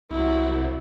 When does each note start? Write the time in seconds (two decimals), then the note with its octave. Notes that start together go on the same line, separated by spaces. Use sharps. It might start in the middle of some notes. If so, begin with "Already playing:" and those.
0.11 C2 F#3 E4